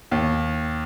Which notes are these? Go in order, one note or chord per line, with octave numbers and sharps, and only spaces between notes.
D#2